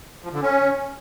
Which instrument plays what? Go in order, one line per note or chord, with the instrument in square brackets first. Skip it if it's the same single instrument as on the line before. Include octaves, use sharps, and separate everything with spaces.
[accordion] F3
D3
C#4